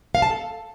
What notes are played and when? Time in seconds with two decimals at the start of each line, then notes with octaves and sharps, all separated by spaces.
0.15 F5
0.22 A5
0.30 A4